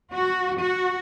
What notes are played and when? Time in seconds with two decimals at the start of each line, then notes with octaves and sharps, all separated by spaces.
0.14 F#4
0.58 F#4